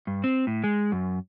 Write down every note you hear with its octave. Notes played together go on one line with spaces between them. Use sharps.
G2
C4
A2
G#3
F#2